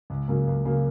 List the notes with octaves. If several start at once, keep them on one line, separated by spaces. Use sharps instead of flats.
C#2
C#3 F#3 A#3
C#2
C#3 F#3 A#3